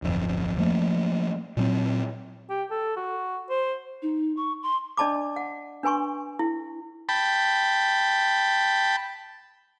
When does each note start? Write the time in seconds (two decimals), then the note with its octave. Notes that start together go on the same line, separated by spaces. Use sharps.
0.02 D1 G1 F2
0.58 F3 A3 A#3
1.57 A#2 F#3 C4
2.50 G4
2.71 A4
2.96 F#4
3.50 C5
4.02 D#4
4.37 C#6
4.63 C6
4.97 D4 D5 D#5 A5 B5 D6
5.36 F#5
5.83 D4 B4 G#5 C6 C#6
6.39 E4
7.09 G5 A5 B5